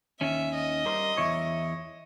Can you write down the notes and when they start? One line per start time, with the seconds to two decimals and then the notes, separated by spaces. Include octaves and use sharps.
0.21 D#2 D#3 C#4 E5
0.54 D#5
0.85 G3 A#4 C5
1.17 E2 E4 C#5